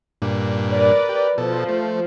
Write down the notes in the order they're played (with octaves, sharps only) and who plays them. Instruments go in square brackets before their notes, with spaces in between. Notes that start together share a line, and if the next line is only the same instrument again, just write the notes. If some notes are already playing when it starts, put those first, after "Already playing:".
[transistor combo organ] G2 A#2 D4
[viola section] A#4 B4 D5
[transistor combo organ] G4
[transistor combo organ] B2 A4 [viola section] F3
[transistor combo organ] A3